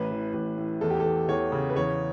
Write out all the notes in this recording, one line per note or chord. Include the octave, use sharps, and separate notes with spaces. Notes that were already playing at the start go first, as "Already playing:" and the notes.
Already playing: A1 B4
E3
A1
A2
E2 A4
G4
A4
E3
E2 C#5
C#3
B4
E2 C#5